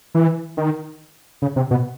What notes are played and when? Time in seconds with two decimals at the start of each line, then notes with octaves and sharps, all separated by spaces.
0.15 E3
0.57 D#3
1.42 C#3
1.56 C3
1.71 B2